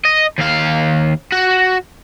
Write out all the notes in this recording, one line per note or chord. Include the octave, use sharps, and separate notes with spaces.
D#5
D#2 F5
F#4